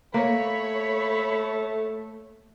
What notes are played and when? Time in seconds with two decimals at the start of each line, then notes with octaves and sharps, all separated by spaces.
0.14 A3 A#3 C#5 B5